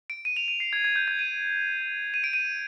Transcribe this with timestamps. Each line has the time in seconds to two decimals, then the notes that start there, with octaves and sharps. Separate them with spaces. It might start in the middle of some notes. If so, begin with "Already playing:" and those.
0.10 D7
0.25 D#7
0.36 F7
0.48 D#7
0.60 C7
0.73 G#6
0.84 G#6
0.96 G6
1.08 G#6
1.19 D#7
2.14 D#7
2.24 D7
2.33 D#7